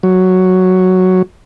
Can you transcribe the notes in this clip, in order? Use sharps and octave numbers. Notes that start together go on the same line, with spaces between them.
F#3